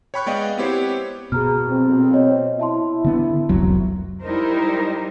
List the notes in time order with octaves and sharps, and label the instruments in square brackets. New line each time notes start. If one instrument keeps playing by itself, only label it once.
[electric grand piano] C#5 G5 B5 C#6 F#6 G6
G#3 B3 D5 D#5 F5 G5
B3 C4 E4 G4 C5 C#5
[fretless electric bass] B2 [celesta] G#4 A#5 F6
[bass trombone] C4
[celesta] C#5 D#5
[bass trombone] E4 [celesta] E5 A5 C6
[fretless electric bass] D3 B3
F1 C2 F#3
[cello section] G3 D#4 A#4 [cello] E4 C5